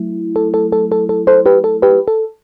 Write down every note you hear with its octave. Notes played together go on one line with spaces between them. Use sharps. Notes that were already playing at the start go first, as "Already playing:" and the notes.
Already playing: F#3 A3 E4
A4
A4
A4
A4
A4
A4 C5
G4 B4
A4
G4 B4
A4